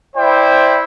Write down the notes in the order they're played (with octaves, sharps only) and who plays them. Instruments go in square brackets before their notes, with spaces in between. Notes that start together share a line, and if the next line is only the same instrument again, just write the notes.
[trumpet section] E4 C5 D5 G5